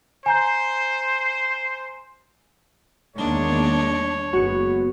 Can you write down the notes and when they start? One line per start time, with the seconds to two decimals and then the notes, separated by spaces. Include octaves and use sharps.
0.26 C5 G#5 A#5 G6
3.16 E2 D#3 G#3 A#3 D4 C#5
4.33 F#1 G#3 B3 F#4